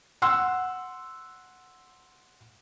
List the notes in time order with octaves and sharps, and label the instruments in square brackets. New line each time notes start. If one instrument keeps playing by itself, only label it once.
[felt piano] F#5 C6 E6